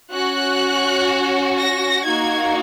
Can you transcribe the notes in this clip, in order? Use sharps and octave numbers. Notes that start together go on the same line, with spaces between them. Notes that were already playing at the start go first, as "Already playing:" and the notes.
C#4 F#4 F#6
A#6
A#3 D#4 F#4 G#6